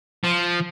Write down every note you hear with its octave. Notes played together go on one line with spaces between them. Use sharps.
F3